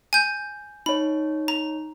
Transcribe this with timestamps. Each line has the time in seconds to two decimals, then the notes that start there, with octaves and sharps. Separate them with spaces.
0.13 G#5 G6
0.86 D#4 C#5 B5
1.48 A#5